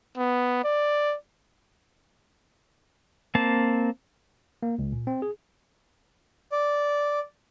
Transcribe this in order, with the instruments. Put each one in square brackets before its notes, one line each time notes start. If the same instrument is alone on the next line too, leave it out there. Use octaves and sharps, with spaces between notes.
[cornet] B3
D5
[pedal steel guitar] A#3 C4 A5
[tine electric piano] A#3
C#2
A#2
C4
G#4
[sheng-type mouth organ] D5